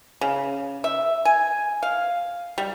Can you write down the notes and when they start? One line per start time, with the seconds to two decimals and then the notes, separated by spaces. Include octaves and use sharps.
0.21 C#3
0.84 E5
1.25 G#5
1.83 F5
2.58 G3